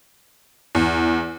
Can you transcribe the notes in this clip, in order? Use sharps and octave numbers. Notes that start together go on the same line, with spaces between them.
E2